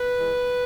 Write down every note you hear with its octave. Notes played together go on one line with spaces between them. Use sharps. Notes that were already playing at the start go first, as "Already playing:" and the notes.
Already playing: B4
E3 G#3